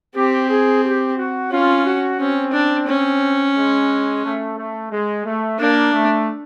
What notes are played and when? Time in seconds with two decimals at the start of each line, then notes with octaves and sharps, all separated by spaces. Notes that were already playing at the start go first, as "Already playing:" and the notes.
0.15 C4 G4
0.49 G#4
0.83 G4
1.17 F#4
1.51 C#4 F4
1.85 F#4
2.20 C4 C#4
2.53 D4
2.88 C#4
3.55 G#3
4.23 A3
4.58 A3
4.91 G#3
5.24 A3
5.59 A#3 D4
5.92 A3